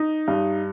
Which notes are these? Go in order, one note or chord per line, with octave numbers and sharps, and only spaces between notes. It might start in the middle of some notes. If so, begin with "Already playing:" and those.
Already playing: D#4
G2